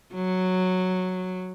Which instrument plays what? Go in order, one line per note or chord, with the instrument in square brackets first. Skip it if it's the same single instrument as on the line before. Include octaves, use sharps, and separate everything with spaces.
[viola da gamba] F#3